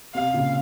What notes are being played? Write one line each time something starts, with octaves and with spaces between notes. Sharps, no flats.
C3 F5
A#2 C#3